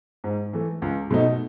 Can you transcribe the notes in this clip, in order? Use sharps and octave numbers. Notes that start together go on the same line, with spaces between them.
G#2
E3 A3
C#2
B2 A3 D#4